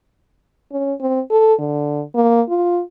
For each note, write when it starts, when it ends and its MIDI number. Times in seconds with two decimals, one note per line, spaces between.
0.72 0.94 61
1.01 1.21 60
1.31 1.54 69
1.59 2.03 50
2.15 2.42 58
2.49 2.81 65